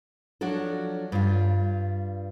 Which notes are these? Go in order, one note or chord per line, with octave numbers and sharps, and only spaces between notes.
F3 F#3 D4 F#4 A4
G2 F4